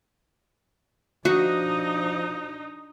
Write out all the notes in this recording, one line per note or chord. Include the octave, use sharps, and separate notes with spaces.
F3 D4 D#4 F#4 D#5